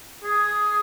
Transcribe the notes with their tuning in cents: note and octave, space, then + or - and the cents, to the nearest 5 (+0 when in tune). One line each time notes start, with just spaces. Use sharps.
G#4 +10